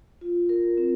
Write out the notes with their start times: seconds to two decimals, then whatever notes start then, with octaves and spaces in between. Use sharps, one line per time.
0.21 F4
0.49 A#4
0.77 C4